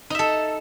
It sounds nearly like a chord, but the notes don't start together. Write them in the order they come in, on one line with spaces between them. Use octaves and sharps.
D#4 E5 A4